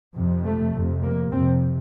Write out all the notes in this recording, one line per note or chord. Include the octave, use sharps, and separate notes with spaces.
F2 C3
A3
F2 C3
A#3
F2 C3 C4